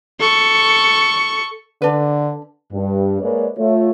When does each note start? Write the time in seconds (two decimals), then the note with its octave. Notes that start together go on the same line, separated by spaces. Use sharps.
0.20 A4 C#6
1.82 D3 D4 B4
2.73 G2
3.22 G#3 A#3 B4 C#5 D5
3.58 A3 F4 C#5